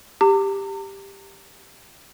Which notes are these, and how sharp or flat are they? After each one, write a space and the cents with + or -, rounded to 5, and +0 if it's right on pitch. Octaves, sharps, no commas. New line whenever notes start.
G4 +10 A#5 -40